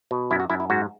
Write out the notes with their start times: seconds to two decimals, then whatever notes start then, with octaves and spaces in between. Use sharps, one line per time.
0.11 B2
0.31 F#2 E4
0.40 F#4
0.50 F#2 E4
0.60 E4
0.70 G#2 F#4